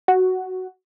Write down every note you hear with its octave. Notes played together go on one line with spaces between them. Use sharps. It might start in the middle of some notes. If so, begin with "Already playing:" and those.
F#4